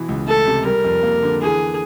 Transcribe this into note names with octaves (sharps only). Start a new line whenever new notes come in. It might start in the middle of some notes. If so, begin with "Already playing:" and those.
Already playing: B2 E3
C#2
A3 A4
C3
G3 A#4
F2
A#3
D3
E3 G#4